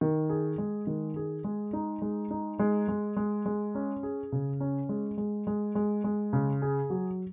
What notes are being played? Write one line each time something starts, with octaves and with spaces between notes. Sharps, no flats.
D#3
G#4
G#3
D#3
G#4
G#3
D#4
G#3
D#4
G#3
G#3
G#3
G#3
C#4
G#4
C#3
C#4
G#3
G#3
G#3
G#3
G#3
C#3
G#4
F#3